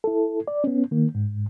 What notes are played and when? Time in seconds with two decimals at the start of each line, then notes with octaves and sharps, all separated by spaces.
0.04 E4 A4
0.48 D5
0.64 B3 C#4
0.91 D#3 A#3
1.15 G#2